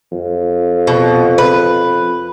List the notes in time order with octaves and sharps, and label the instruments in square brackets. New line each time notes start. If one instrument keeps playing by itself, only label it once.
[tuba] F2
[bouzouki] B2
B4